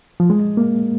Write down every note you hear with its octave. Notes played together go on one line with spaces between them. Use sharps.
F3
G#3
A#3